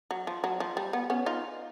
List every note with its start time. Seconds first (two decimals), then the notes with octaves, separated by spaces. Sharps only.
0.11 F#3
0.27 F3
0.44 F#3
0.60 F3
0.77 G3
0.93 B3
1.10 B3 C#4
1.26 D#4 F4